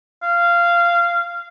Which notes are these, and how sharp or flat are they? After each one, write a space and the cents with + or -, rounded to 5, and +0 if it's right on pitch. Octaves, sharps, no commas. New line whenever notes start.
F5 -15